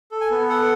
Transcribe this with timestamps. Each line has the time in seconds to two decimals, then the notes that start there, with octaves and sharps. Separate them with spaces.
0.11 A4
0.21 G#5
0.31 B3
0.49 A4 F#5